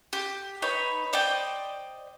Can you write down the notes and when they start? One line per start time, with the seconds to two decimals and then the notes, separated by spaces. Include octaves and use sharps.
0.13 G4
0.62 D#4 B4 C#5 B5
1.13 C5 D5 D#5 G5